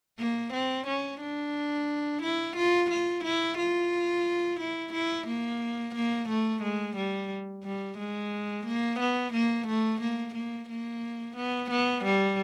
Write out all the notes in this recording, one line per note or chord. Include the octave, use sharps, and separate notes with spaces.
A#3
C4
C#4
D4
E4
F4
F4
E4
F4
E4
E4
A#3
A#3
A3
G#3
G3
G3
G#3
A#3
B3
A#3
A3
A#3
A#3
A#3
B3
B3
G3